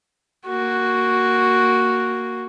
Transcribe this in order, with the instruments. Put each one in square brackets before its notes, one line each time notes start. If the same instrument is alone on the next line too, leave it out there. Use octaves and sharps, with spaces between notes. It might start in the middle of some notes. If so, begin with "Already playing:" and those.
[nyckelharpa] A#3 F#4